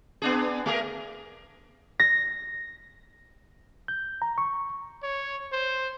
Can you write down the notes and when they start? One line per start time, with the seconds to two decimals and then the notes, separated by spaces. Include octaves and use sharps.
0.22 B3 D4 G#4
0.66 A3 G#4 A#4
1.99 A#6
3.88 G6
4.22 A#5
4.38 C#6
5.03 C#5
5.52 C5